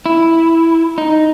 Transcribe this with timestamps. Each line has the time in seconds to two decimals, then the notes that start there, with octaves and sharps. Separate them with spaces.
0.06 E4
0.98 D#4